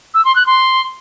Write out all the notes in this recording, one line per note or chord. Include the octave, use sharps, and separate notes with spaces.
E6
C6
F#6
C6